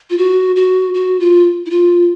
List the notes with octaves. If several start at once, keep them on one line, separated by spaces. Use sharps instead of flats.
F4
F#4
F#4
F#4
F4
E4
F4